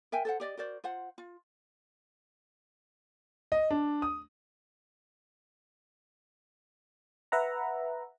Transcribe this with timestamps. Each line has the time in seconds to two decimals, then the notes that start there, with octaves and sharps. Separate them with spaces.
0.12 A#4 E5 G5 G#5
0.25 A4 C5 F#5
0.40 G4 D5 D#5
0.57 F#4 A#4 C5 D5
0.84 F4 C5 F#5
1.18 F4
3.52 D#5
3.71 D4
4.02 D#6
7.32 B4 E5 F#5 A#5